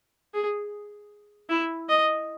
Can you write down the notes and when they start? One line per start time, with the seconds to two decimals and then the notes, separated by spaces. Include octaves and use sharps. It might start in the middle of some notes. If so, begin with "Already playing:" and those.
0.34 G#4
1.50 E4
1.89 D#5